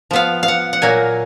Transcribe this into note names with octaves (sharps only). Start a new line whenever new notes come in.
F3 B3 F5
F5
F#5
F#5
A#2 F#3 A#3 G#5